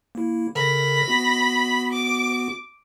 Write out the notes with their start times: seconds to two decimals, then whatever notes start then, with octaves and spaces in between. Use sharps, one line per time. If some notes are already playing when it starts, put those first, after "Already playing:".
0.15 A#3 E4
0.55 C#3 A4 A#4 B5 A#6
1.08 B3 F#4
1.93 D6